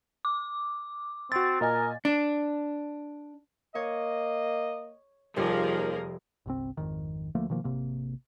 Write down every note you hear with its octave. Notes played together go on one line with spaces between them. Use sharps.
D6
C4 F#4 A6
A#2 A#4 D#5 G#5
D4
A#3 C#5 D#5
F1 D#2 F3 G3 A#3 G#4 A#4 F5
G1 C2 C4
G#1 F2 D#3
D2 F3 A3 A#3
B2 D#3 F3 A#3
G#1 C3 A#3